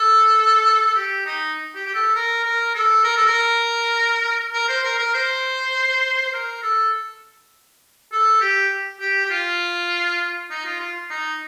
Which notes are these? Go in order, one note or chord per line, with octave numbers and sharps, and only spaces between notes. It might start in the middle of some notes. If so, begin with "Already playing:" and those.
Already playing: A4
A4
G4
D#4
G4
G4
A4
A#4
A#4
A4
A#4
A4
A#4
A#4
C5
A#4
A#4
C5
C5
A#4
A4
A4
G4
G4
G4
F4
D#4
F4
F4
D#4